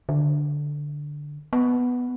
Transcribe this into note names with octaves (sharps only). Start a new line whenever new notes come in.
D3
B3